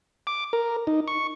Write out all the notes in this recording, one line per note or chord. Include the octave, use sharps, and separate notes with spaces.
D6
A#4
D#4
C#6